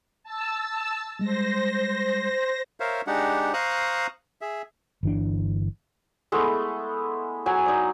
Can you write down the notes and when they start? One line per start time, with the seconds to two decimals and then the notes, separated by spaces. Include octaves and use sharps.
0.24 A5 E6
1.19 G3 G#3 C5 A#6
2.80 A#4 C5 C#5 E5 F5
3.07 G#3 D4 D#4 G4 F#5
3.54 C5 F5 A#5 C#6 D#6 F#6
4.41 G#4 E5
5.03 G1 E3 D4
6.32 G#3 A3 B3 E4
7.46 F#3 G#5
7.66 D#4 D5